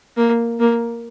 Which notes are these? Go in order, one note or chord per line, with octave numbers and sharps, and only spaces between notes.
A#3
A#3